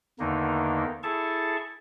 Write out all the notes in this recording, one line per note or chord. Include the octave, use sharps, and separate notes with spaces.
E2 D3 D#3 A#3 D#4
E4 G#4 A4 A5 C#6